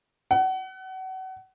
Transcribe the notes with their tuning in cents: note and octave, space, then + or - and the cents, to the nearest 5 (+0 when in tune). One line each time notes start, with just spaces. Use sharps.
F#5 +30